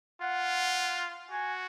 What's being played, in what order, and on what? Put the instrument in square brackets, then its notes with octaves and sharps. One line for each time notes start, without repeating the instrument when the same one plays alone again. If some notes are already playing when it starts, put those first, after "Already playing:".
[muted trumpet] F4 [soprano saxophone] F#5
[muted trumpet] F#4 [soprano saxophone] G#5